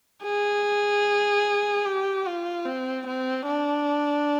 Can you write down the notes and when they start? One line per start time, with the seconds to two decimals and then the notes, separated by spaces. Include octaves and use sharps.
0.24 G#4
1.85 G4
2.26 F4
2.66 C4
3.07 C4
3.47 D4